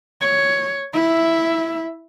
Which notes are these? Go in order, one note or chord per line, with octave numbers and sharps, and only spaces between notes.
C#5
E4 E5